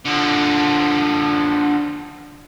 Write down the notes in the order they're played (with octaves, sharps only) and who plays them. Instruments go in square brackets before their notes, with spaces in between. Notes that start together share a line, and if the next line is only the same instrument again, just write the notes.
[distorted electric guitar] D3 F3